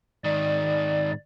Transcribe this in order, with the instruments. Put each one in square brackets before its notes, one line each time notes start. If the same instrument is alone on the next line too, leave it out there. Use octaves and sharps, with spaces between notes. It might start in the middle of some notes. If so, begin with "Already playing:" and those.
[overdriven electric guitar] G#2 D#3 [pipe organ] D5